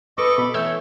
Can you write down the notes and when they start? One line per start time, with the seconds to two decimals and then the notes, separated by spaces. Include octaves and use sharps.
0.18 A4 B4 D#5 C#6 D6
0.38 B2 B5
0.54 E3 A3 C#5 E6 G6